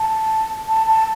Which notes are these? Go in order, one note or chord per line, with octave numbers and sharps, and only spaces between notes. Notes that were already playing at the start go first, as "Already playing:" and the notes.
Already playing: A5
A5
A5